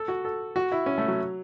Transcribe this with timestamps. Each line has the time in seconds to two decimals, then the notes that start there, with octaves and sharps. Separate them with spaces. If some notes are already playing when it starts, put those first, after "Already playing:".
Already playing: A4
0.08 F#4
0.25 A4
0.56 F#4
0.72 E4
0.86 C#4
0.98 A3
1.08 F#3